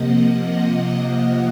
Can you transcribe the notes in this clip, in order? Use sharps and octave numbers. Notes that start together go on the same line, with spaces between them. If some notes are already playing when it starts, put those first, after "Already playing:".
Already playing: C3 F3 A#3 D#5 F#5
D#5 F#5